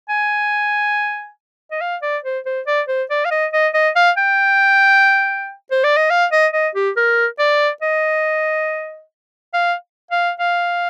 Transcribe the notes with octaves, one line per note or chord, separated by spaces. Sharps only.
G#5
D#5
F5
D5
C5
C5
D5
C5
D5
F5
D#5
D#5
D#5
F5
G5
C5
D5
D#5
F5
D#5
D#5
G4
A#4
D5
D#5
F5
F5
F5